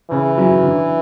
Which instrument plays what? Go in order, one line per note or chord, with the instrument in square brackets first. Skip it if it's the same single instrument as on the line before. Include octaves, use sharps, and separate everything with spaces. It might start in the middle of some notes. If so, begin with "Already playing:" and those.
[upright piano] C#3 [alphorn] E3
[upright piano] F#3 C#4 E4
D3